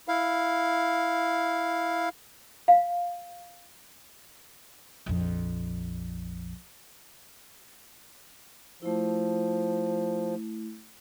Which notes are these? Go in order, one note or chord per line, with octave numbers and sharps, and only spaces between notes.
E4 F5
F5
A#1 F2
F3 A3 E4